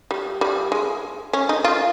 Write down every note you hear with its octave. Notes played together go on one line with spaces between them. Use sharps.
G3
G3
G#3
C#4
D#4
F4